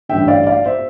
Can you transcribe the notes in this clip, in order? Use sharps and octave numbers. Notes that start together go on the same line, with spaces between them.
A1 G2 D3 E5 G5
D5 F5
D5 F5
C5 E5